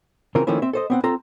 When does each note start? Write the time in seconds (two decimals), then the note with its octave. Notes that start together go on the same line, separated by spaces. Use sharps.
0.35 C#3 E3 C4 F4 A#4
0.47 D#3 F3 A3 A#3 C#4 E4
0.62 C4 E5
0.73 A4 C5 D#5
0.90 B3 C4 F#5
1.04 C4 F4 A4 A#5